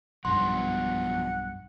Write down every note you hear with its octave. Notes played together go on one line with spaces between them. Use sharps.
B1 G2 F3 F#3 B3 F#5 C6